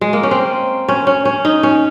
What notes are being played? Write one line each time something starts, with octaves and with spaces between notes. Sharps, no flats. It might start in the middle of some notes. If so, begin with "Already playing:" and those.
G#3
A#3
C#4
C4
C#4
C#4
C#4
D#4
C#4